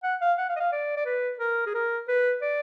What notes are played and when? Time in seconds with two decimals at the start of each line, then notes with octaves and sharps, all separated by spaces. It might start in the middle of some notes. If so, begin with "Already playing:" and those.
0.03 F#5
0.21 F5
0.38 F#5
0.49 F5
0.56 D#5
0.60 F5
0.72 D5
0.97 D5
1.06 B4
1.39 A#4
1.66 G#4
1.74 A#4
2.08 B4
2.41 D5